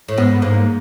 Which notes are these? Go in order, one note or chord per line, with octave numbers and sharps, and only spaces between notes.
A2
G#2 B3
B3
G#2 A#3